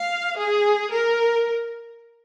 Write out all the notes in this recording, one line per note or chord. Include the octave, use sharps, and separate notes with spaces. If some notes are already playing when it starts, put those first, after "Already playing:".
Already playing: F5
G#4
A#4